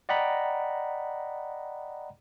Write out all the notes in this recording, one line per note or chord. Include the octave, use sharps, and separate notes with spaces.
D5 D#5 F#5 G5 A#5 B5